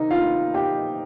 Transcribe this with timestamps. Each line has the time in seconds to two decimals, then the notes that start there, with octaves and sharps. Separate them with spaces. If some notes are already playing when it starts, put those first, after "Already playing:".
Already playing: C3 D#3 A#3 D#4
0.11 F4 F5
0.54 G4 G5